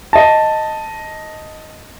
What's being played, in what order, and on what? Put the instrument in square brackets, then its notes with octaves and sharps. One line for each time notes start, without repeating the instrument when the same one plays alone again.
[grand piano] D#5 A5